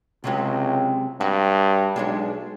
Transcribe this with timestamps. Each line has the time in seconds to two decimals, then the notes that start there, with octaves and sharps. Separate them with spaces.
0.24 C#2 C3 F#3 G#3
1.21 G2 F#4
1.96 B1 G#3 D4 C#5